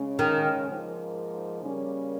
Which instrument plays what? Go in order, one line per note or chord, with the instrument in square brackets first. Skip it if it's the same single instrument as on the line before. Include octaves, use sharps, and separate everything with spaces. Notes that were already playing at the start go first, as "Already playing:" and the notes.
Already playing: [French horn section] C#3 G#3 C#4
[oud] D#3
[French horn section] G#2 F3 A#3 D#4
C#3 G3 A#3 C#4